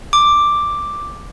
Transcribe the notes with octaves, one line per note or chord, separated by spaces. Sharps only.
D6